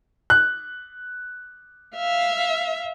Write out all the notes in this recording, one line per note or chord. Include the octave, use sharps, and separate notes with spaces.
F#6
E5 F5